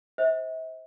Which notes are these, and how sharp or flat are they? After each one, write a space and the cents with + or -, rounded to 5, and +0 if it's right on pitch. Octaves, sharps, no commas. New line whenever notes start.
C5 +0 E5 -40